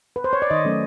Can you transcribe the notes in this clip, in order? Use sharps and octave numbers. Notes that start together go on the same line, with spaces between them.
B4
C5
C#5
D5
D#3 D#5
F#3 A3 C#4